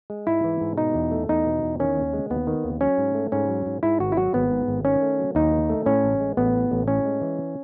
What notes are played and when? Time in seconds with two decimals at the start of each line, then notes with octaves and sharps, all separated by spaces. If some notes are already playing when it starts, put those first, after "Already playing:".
0.10 G#3
0.27 G#2 E4
0.44 E3
0.61 G#2
0.78 B2 D#4
0.94 E2
1.11 A3
1.29 E2 D#4
1.46 B2
1.63 E2
1.80 D#3 C#4
1.96 D#2
2.13 G#3
2.30 D#2 B3
2.47 D#3
2.64 D#2
2.81 F#3 C#4
2.98 G#2
3.15 A3
3.32 G#2 C#4
3.48 F#3
3.66 G#2
3.83 G#2 E4
4.00 G#1 F#4
4.12 E4
4.16 F#3 F#4
4.34 G#1 B3
4.51 G#2
4.68 G#1
4.85 D#3 C#4
5.02 A3
5.19 F#3
5.35 D#2 D#4
5.52 D#3
5.69 A3
5.86 A2 C#4
6.04 A1
6.20 G#3
6.37 A1 B3
6.55 A2
6.72 A1
6.88 A2 C#4
7.05 G#3
7.22 E3